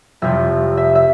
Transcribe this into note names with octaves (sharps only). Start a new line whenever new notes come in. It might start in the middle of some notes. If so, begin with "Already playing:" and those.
F1 F2 C3 F3 E5
E5
E5